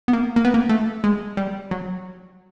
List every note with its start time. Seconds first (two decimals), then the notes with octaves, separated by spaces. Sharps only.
0.08 B3
0.13 A#3
0.36 A#3
0.45 B3
0.54 A#3
0.69 A3
1.04 G#3
1.37 G3
1.71 F#3